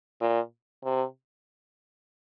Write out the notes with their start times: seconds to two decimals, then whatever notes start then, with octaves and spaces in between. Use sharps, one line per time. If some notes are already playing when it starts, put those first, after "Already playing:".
0.21 A#2
0.84 C3